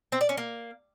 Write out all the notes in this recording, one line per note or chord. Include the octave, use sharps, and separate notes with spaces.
C4
D5
C#4
A#3